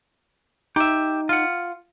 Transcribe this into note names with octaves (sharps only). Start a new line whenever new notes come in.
D#4 G4 E5
F4 F#5